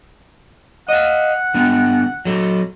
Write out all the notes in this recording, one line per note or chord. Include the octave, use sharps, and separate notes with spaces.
D#5 F5 F#5
D3 B3
F#3 A4